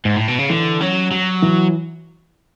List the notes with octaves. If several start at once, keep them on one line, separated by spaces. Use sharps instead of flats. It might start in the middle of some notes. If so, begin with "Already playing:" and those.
G#2
A2
B2
C#3
D3 E3
F#3 C#4
F#3 F#4
E3